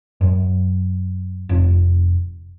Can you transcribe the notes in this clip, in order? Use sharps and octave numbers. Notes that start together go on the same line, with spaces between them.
F#2
F1